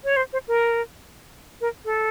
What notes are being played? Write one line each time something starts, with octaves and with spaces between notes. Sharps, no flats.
C#5
C5
C5
A#4
A#4
A4